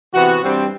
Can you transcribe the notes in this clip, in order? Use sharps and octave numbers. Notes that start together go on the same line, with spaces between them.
C3 E3 B3 F#4
G2 E3 G3 C4